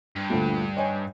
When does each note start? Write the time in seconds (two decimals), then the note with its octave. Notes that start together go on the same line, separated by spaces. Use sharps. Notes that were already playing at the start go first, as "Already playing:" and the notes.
0.16 G2
0.30 D2 A#2 A3
0.77 C#5 D#5 G#5